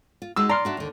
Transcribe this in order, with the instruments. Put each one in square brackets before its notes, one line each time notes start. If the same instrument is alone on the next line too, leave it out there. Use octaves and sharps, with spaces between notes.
[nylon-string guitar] F4
[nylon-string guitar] G#3 D#4 F#4 [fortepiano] E6
[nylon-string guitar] D5 [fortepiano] A#5 C6 F6
[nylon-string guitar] D4 F#4 E5
D#2 D3